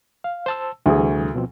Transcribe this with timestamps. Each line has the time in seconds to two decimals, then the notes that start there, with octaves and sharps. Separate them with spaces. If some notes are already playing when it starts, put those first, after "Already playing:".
0.24 F5
0.46 C5 A5 E6
0.86 D2 C3 E3 G3 G#4
1.35 B2 F3 C4